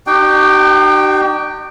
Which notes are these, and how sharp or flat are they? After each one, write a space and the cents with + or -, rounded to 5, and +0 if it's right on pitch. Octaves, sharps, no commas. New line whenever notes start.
D#4 -45 G4 -45 G5 +0